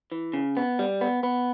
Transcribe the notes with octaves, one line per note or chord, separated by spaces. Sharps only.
E3
C#3
B3
G3
B3
B3